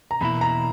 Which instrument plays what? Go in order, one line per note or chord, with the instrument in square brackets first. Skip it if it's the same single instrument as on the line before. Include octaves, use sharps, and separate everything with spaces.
[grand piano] A#5
[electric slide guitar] E2 B2 A#3 E4 [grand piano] B5
[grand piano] A#5